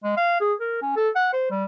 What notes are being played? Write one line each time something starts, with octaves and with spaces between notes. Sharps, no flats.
G#3
F5
G#4
A#4
C#4
A4
F#5
C5
G3